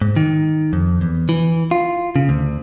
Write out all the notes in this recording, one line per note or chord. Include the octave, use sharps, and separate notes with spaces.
G#2
D#3
F2
E2
E3
F4
C#3
D2